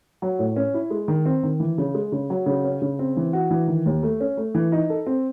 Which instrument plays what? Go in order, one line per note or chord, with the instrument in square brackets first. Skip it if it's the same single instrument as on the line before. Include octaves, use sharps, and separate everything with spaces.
[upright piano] F#3
A2
C#4
E4
G#3
D#3
C4
D#3
E3
C#3
G#3
C#3
F#3
C#3
C#4
C#3
C4
E3
F#4
E3
D#3
D#2
A3
C#4
A3
E3
D#4
A4
C4